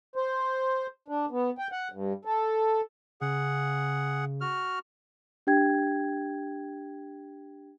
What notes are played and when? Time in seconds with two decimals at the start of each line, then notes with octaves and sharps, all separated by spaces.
0.16 C5
1.08 D4
1.31 B3
1.58 G5
1.72 F#5
1.92 G2
2.25 A4
3.21 C#3 G#4 F#5
4.41 F#4 F6
5.47 D4 G4 G5 G#6